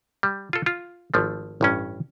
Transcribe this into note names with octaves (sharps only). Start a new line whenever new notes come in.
G3
F4 A4
F4
G#1 F3 A3
A1 G2 C#4